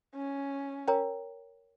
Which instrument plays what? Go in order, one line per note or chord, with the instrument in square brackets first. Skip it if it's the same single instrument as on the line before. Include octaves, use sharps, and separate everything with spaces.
[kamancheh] C#4
[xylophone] A#4 C#5 G5 A#5